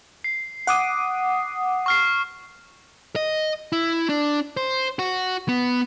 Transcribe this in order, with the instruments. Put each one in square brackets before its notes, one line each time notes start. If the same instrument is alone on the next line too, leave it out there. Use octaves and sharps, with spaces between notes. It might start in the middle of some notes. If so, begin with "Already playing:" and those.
[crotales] C7
[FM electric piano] F#5 D6 D#6
[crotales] C#6 F6 C7
[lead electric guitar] D#5
E4
D4
C5
F#4
B3